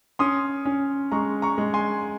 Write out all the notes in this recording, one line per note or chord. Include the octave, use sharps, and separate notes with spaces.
C#4 C6 D#6
C#4
G#3 A#5 C#6
A#5 C#6
G#3
G#5 C6